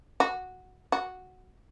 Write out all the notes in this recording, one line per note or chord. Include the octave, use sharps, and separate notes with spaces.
F#4
F#4